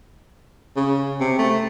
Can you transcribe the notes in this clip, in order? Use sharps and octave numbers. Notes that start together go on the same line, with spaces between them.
C#3
C3
A3